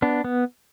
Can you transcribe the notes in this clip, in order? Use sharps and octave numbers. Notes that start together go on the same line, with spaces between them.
B3 D4
B3